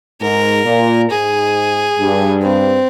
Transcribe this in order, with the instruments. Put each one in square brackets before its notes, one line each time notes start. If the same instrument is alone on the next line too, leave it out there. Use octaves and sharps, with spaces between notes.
[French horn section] G#2 [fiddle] A#4
[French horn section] A#2
[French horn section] G#2 [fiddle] G#4
[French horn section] G2
[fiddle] C4